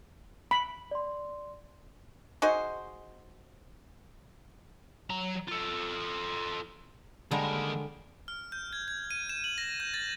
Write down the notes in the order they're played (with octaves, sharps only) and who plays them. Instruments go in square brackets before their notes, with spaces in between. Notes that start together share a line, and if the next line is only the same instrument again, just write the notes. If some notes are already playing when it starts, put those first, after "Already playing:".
[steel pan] B5
[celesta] D5 C6
[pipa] D#4 F#4 G#4 C5
[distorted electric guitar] F#3 A#5
F4 A4
[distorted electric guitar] D#2 A#4 [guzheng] D3 G3 G#3
[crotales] F6
G6
G#6
G#6
D#7
E7
F#7
A#6
G6
A6